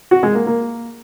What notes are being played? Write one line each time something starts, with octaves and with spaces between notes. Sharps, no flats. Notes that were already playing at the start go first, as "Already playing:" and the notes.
F#4
G#3
A#3
A#3